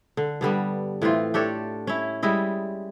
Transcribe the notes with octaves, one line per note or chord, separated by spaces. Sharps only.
D3
G2 D3 G3 B3
A2 E3 C4 F4
D4 G4 A4 C#5
C#4 E4
G3 G#3 E4 D#5